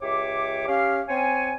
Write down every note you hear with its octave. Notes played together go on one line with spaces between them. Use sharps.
C#2 G4 C#5 E5 D6
C#4 G4 F5
C4 C#5 G#5